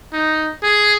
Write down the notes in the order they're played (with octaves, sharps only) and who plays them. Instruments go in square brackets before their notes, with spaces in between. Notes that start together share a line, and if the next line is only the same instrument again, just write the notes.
[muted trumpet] D#4
G#4